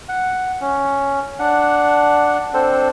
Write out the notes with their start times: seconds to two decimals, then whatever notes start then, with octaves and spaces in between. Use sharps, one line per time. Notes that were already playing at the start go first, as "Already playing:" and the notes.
0.09 F#5
0.61 C#4
1.39 D4 F#5
2.54 C4 D4 A4 C5